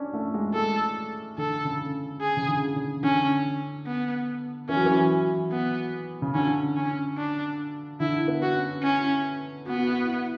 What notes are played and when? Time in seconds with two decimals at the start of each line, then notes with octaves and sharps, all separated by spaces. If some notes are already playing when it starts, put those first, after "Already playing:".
Already playing: C#4 D4
0.13 A3
0.34 G#3
0.54 G#3 A4
1.38 D3 A4
1.65 C#3
2.21 G#4
2.37 C#3
2.48 D3
2.76 C#3
3.03 D3 C#4
3.86 B3
4.69 E3 C#4
4.77 F#3
4.86 E3
5.51 B3
6.22 C#3
6.35 D3 C#4
6.77 C#4
7.17 D4
8.00 D3 E4
8.28 B3
8.42 F#4
8.56 C#4
8.83 C#4 E4
9.66 B3 F#4
9.77 F#4
9.87 E4
10.07 E4